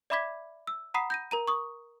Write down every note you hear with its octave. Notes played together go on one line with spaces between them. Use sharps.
D5 E5 B5 D6 G#6 B6
E6
F#5 A#5 B5 D#6 B6 C7
G6 A#6 D#7
A#4 A#5 D#7
C#6 D#6